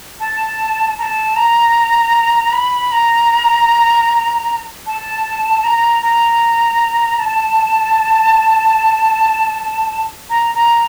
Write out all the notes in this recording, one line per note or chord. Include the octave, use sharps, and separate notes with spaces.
A5
A#5
A5
A#5
B5
A#5
A5
A#5
A#5
A5
A#5
A#5